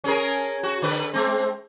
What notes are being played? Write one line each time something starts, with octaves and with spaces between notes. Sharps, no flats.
C#4 G#4 A#4
F#4
D3 B4
G#3 C4